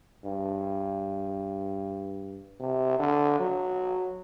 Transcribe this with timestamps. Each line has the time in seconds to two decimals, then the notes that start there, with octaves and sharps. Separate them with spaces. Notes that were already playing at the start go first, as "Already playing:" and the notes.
0.24 G2
2.60 C3
2.99 D3
3.40 F#3